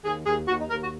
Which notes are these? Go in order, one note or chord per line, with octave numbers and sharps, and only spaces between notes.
D#2 G#4
D#2 G#4
D#2 F#4
D#4
D#2 A#4
F#4